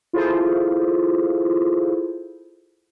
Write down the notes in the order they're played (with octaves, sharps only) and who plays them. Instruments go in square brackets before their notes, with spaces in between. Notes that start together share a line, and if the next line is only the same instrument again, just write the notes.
[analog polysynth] E4 F4 G#4 A4 C5